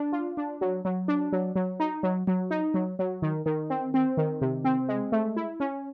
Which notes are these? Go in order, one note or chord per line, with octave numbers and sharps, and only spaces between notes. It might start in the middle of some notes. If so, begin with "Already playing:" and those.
Already playing: D4
F4
D4
F#3
F#3
D4
F#3
F#3
D#4
F#3
F#3
D#4
F#3
F#3
D#3
D#3
C4
C4
D#3
C3
C4
G#3
A3
E4
C#4